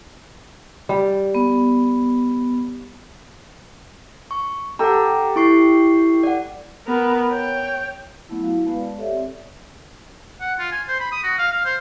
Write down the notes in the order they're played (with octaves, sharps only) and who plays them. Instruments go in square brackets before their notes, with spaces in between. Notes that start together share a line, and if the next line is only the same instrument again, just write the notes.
[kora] G3
[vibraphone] B3
[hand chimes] C#6
[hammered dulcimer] G4 A4 [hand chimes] F#5 A#5
[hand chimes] E4 C#6 C7
D5 F#5
[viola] B3 A#4
C#5 G5
[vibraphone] F#3 A3 B3 E4
E4 F#4 F5
G#3 B3 B4 F5 A5
D5
G4 A4 C#5 D5 E5
C4
[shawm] F#5
F4
G#5
C5
B5
D#6
F#4
F5
F5
C5